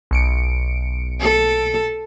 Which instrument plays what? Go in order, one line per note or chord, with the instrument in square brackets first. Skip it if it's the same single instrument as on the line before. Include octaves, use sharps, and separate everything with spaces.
[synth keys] B1 C#7 D7
[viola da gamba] A4